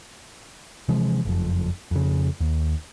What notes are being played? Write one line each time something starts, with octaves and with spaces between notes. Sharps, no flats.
C3 E3 F3 G#3
F#1 F2
F2 C#3
D#2